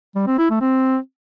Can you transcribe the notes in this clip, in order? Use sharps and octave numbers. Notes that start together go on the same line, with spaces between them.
G3
C4
E4
A3
C4